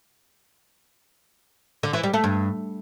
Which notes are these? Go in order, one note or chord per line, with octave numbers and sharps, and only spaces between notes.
D3
E3
G3
A3
G2